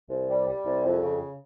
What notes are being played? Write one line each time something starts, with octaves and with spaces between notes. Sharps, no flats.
C2
G3
G3
C2
F2
C#3